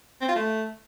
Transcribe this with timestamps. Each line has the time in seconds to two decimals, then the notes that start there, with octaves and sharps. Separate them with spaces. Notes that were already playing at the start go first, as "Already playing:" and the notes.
0.21 C4
0.28 F4
0.36 A3